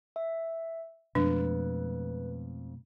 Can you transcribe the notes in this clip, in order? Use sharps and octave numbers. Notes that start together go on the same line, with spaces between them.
E5
F2 B2 G#3 A3 D4 B4